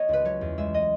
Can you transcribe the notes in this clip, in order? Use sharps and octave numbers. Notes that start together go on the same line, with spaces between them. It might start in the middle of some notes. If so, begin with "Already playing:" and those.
Already playing: A3 B3 C#5 D#5
C#2 B4
F#3 C#5
E2
G#3 E5
D#5